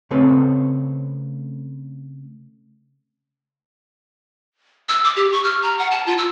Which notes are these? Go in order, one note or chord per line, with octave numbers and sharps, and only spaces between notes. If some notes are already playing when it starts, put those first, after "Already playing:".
C#3 A3 C4 A4 B4 C#5
E6
D6
G4
C#6
F6
A#5
F#5
A5
F4
E6